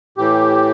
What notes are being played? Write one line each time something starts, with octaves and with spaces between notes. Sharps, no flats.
A2 E3 G4